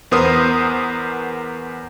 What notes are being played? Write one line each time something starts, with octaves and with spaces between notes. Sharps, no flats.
E2 B3 A#4 C5 D#6